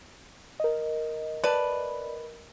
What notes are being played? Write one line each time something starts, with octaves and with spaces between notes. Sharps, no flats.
A#4 D#5
B4 D5 A5